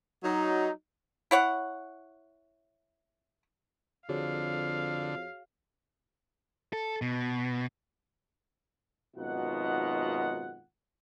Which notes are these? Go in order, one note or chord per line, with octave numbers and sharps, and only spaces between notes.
F#3 D#4
E4 C#5 F#5
F2 D3 F#4 G#4 C#5 F5
A4
B2
G#1 F#2 B2 D#4 F4 F#5